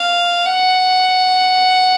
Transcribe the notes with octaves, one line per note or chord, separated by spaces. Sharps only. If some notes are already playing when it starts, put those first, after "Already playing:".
Already playing: F5
F#5